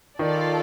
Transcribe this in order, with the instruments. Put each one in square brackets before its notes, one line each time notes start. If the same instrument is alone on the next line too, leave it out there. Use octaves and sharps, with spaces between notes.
[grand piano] D#3 [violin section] F4 A4 D5